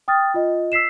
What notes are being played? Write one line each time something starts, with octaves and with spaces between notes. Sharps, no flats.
G5 D#6 F6 A6
F4 D#5
E6 B6 C7 E7